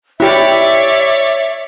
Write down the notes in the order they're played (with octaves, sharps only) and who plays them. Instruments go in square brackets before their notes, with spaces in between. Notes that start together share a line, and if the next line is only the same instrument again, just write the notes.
[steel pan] E4 G4 [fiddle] C#5 D5 [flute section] E5